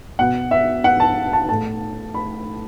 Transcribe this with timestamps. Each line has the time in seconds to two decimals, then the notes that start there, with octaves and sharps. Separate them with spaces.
0.19 B2 B3 F#5
0.51 E5
0.84 F#5
1.00 A5
1.33 A5
1.49 A2 A3 A5
2.14 B5